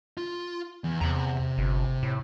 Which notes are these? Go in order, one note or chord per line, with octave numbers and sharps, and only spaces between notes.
F4
E2
E2 C3 A#5
G1
A2